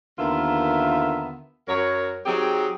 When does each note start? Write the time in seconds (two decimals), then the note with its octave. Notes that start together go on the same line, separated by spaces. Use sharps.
0.19 D#2 D3 B3 F4 A#4 E5
1.68 F#2 F#3 A#4 C#5
2.26 F#3 C4 D#4 G4 G#4